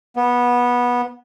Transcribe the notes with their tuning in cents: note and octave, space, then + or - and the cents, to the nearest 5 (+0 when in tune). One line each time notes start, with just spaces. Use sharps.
B3 -15